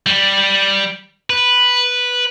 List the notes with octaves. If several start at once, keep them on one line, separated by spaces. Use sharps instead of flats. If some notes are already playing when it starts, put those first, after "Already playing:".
G3
B4